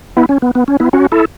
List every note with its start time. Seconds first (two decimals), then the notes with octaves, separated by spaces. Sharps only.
0.17 B3 E4
0.29 C#4
0.42 B3
0.55 B3
0.68 C#4
0.80 B3 E4
0.93 C#4 F#4
1.12 E4 A4